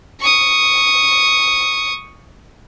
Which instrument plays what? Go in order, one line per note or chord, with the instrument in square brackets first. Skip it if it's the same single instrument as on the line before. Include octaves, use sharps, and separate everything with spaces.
[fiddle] C#6 D#6